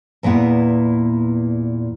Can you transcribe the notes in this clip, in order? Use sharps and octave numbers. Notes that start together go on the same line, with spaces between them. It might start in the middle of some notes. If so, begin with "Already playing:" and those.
E2 A#2 B3 E4 F#5